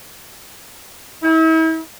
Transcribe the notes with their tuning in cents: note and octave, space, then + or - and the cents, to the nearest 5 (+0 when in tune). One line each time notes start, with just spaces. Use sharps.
E4 -40